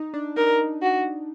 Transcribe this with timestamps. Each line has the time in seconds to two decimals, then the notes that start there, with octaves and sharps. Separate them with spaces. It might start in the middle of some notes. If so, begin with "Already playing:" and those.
Already playing: D#4
0.14 D4
0.37 D#4 A#4
0.82 F#4